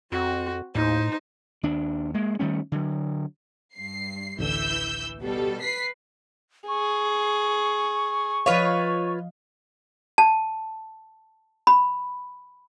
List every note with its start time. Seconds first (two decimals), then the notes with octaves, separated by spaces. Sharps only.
0.12 F2 C4 F#4
0.75 D#2 A2 D#4 C5
1.63 D#2 D4
2.14 G#3 A#3
2.39 D#3 G3 A3 C#4
2.72 D3 F#3
3.75 G2 C7
4.38 A1 D2 D3 E3 E6 G6
5.21 B2 G3 A4
5.61 B4 B6 C7
6.68 G#4 C#6
8.46 F3 F4 B4 C#5 D#5 F5
10.18 A5
11.67 B5